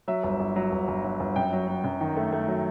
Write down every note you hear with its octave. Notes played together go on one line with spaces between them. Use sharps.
F#3 E5
G1
G1
F#3
G1
G1
F#3
G1
F#2 G5
F#3
F#3
F#2
D#3
A3
A3
F#3